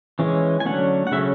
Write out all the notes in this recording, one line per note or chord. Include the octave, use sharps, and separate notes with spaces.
E3 G#3 C#4
G#5
D3 F#3 A3 C#4 F#5
F#5
C#3 F#3 A3 C#4 E5